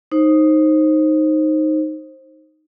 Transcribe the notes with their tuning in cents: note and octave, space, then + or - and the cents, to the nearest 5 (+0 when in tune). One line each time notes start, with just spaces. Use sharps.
D#4 +0 C5 +20